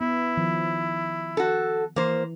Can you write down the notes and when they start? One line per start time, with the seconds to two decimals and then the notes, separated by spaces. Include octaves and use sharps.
0.01 B3 E4
0.37 D#3 F3
1.37 F#4 A4
1.96 E3 A#3 C5